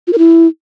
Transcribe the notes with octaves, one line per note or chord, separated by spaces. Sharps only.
F4
A#4
E4